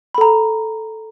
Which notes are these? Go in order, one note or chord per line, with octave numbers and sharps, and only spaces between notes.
A4 A#5 B5